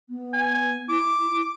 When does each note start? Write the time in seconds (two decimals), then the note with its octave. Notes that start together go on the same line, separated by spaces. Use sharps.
0.10 B3
0.33 G#5
0.89 E4 D6